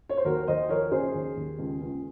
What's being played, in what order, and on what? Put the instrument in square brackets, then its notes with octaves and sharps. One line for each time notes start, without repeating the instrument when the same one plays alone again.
[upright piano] C#5
C5
D#2 F#4 A#4
D#2 C5 D#5
F3 A#4 C#5
C#3 G#4 C5
D#2
D#2
C#2
C#2